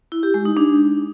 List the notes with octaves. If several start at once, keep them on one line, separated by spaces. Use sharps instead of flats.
E4
G4
G#3
D#4
D4